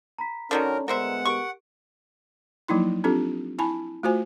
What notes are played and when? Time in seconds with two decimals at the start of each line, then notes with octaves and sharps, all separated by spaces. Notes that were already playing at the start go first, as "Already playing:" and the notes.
0.18 A#5 B5 B6
0.51 D3 D#3 F#3 C#4 A4 A#4 D5 A#5
0.88 D2 G#3 B3 A#4 C5 E5 F#5
1.25 G4 A#4 C#6 D7
2.68 F3 F#3 A#3 D#4 E4 C6
3.04 C4 D4 F4 G4 A4
3.59 E4 G#5 A5 B5
4.03 A3 F4 F#4 C5 G#5